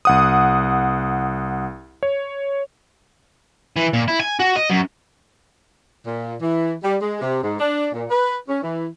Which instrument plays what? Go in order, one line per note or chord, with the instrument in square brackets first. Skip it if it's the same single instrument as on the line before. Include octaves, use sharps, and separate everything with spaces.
[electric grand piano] C2 F#5 D#6
C#5
[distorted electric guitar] E3
A#2
E4
G#5
F#4
D#5
F#2
[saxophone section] A#2
E3
G3
G#3
C3
G#2
D4
A#2
B4
C#4
E3